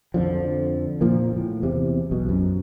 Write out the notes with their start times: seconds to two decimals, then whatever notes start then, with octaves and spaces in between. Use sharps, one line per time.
0.14 F2 D3 F3
1.01 A#2 F3 A#3
1.37 A2
1.63 E2 C3
2.11 B1 B2
2.29 F#2